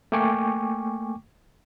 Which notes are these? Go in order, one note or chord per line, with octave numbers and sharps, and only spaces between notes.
A3 A#3 G5 G#5 C#6 D6